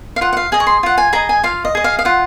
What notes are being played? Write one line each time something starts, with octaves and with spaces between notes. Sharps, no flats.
F5
F4 F#5
F#5
F5
G#4 D#5 G#5
C#6
C6
F4 F#5
G#5
G#4 D#5 A#5
G#5
F4 F5
D#5
G#4 D#5
F5
F5
F4 F#5